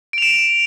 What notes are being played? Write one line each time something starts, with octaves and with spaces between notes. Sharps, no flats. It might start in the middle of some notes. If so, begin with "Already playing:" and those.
D7 E7 F7